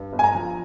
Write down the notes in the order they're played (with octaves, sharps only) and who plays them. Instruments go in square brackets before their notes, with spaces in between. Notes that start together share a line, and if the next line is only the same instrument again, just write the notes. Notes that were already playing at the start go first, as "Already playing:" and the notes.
Already playing: [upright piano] G2
G1
G#5
A#5
F3